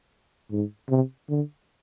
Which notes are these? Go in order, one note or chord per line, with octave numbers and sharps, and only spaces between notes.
G#2
C3
D3